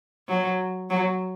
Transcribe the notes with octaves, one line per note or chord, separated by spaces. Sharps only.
F#3
F#3